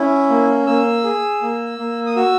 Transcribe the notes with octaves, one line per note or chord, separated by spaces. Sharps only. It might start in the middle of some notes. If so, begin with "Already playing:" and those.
Already playing: C#4 E4
A#3
A#3 E6
G#4
A#3
A#3
D#6
F#4 E6